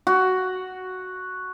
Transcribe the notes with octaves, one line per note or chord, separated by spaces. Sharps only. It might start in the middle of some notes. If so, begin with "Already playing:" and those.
F#4